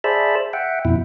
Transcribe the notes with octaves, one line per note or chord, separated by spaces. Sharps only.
G#4 C5 D5 E5 A5 B5
E5 F#5 G5
F2 B2 E4